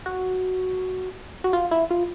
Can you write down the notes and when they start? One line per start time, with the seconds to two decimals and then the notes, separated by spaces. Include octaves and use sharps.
0.06 F#4
1.44 F#4
1.53 F4
1.71 E4
1.91 F4